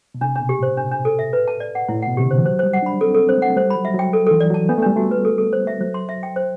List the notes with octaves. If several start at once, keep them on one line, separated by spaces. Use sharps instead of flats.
B2
C3 D4
B2 D4
G4
A2 C5
D4
D4
A4
E5
B4
A5
D5
F#5
A2 E4
B2 F#5
C3 G4
D3 C5
E3
F#3 C5
G3 C5
F#5
D4 B5
C4 A4
C4 A4
C5
A3 F#5
G3 C5
B5
F#3
E5
F#3
G5
A4
E3 A4
D5
F#3 A5
B3 D4
A3
G3 D4
A3 F#4
B4
A4
A4
C5
E5
F#3 C5
C6
E5
G5
C5